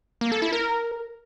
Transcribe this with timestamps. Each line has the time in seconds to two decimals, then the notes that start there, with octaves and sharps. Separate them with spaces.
0.21 A#3
0.32 A4
0.42 E4
0.52 A#4